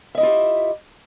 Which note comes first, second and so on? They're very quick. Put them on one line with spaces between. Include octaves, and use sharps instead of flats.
E5 D#5 E4 F4 G4